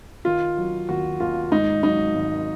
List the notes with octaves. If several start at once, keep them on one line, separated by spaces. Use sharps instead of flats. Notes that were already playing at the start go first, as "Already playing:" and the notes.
D#3 F4
F#3
D#2 F#4
D#2 F4
G#2 D#4
F#3 D#4
G#1